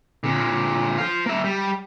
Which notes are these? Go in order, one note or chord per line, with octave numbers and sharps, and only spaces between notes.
A#2 D3
C5 F5
A#3 E5
G3